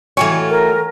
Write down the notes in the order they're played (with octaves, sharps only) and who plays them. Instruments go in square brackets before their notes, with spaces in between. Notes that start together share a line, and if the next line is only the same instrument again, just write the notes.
[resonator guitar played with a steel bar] E3 C#5 [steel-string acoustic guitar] A3 F4 F#4 [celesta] G5 G#5 C#6
[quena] A#4